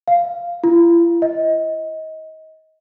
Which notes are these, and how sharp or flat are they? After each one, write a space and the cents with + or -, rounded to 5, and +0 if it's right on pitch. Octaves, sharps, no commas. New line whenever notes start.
F5 -5
E4 +45
D#5 +25